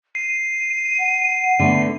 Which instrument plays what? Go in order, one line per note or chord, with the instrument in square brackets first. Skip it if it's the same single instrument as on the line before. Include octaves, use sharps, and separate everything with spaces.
[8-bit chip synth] C7 [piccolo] D#7
[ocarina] F#5
[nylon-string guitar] D3 A3 B3